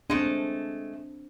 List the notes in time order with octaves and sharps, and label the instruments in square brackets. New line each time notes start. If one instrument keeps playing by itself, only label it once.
[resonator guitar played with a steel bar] G#3 A3 [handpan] C4 D4